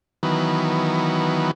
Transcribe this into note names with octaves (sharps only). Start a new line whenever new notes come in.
D#3 E3 F#3 B3